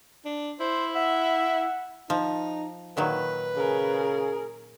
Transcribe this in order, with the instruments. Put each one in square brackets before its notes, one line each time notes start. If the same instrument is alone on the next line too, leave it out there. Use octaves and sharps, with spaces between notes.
[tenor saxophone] D4
[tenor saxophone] E4 [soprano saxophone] C5
[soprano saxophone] E5 [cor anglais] F#5
[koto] F3 [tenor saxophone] D#4
[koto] A#2 D#3 F#3 [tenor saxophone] B4
[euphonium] C#3 [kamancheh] G#4 A#4